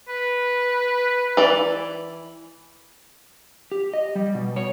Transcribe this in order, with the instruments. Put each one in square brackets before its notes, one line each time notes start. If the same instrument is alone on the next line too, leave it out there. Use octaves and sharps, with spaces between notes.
[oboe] B4
[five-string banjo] E3 D5
[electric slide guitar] G4
D#5
G3
B2
C#5